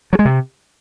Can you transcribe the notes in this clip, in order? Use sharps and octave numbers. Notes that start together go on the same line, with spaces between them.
F#3
G#3
C3